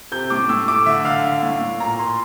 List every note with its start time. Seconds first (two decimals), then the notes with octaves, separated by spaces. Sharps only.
0.12 C3 G6
0.30 A2 D6
0.49 A2 E6
0.68 A3 D6
0.86 D3 E5
1.05 D3 F5
1.24 D3
1.43 A2
1.61 A2
1.80 A#2 A#5
1.99 A#2 C6